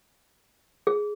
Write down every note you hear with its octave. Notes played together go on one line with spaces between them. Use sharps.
G#4